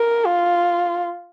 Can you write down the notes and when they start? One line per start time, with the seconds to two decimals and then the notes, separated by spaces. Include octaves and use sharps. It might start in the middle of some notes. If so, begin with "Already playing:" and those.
Already playing: A#4
0.26 F4